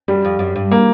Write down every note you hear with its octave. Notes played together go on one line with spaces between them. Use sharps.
F#2 G3
F2
F#2
G2
A#3